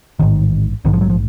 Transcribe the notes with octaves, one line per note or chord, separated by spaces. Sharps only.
A1 G#2 D#3
A#1 G#2 D#3
F3
F#3
F3